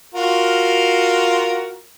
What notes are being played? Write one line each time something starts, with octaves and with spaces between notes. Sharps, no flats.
F4 F#4 A#4